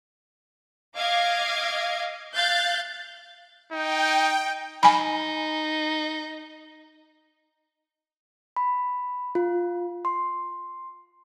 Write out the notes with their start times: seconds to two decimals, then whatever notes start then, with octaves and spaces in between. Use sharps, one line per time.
0.96 D#5 F5 D6 G#6
2.36 F5 F#6 G6 A6
3.72 D#4 G5
4.83 D#4 G#5 B5
8.56 B5
9.35 F4
10.05 C6